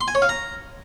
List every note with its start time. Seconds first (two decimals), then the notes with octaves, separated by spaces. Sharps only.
0.01 C6
0.08 G#5
0.15 C#5
0.22 F5
0.29 A#5